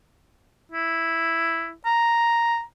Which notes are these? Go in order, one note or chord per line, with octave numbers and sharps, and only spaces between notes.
E4
A#5